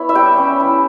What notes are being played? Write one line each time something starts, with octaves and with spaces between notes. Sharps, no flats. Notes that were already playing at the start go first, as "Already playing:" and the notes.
Already playing: B3 E4 C#5
E5
G3 G5
C#4
E4